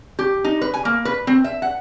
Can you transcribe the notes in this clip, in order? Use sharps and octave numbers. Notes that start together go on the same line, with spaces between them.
G4
D#4
B4
G#5
A#3
B4
C4
E5
F#5